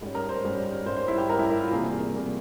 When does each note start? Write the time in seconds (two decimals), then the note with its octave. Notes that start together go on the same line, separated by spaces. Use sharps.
0.01 G#2 G3 C#4
0.15 A#4
0.29 C5
0.44 G#2 G3 C#4
0.86 G#2 G3 C#4 C5
0.97 C5
1.08 E4
1.18 G4
1.29 G#2 G3 C#4 A#4
1.39 E4
1.50 E4
1.61 F4
1.71 E2 C3 G3 A#3 G#4
2.14 C3 G3 A#3